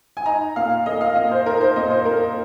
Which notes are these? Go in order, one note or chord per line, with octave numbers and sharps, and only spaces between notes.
G#5
D#4 A#5
A#2 F5
A#3 D#5
F5
A#2 D#5
C5
D#4 A#4
C5
A#2 D#5
C5
A#3 A#4